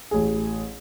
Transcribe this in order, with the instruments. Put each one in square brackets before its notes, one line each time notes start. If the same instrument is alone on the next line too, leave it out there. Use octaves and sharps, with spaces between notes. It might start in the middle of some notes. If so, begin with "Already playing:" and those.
[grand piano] A1 G#4